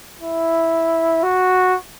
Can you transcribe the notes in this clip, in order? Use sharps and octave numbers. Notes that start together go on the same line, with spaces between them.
E4
F#4